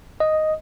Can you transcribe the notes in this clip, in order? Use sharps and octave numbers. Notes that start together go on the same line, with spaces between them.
D#5